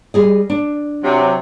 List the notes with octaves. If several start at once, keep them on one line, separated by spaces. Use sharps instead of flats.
G3 G#4 D#5
D4
C3 F#3